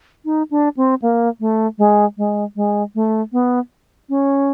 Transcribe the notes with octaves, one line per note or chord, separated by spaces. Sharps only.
D#4
D4
C4
A#3
A3
G#3
G#3
G#3
A3
B3
C#4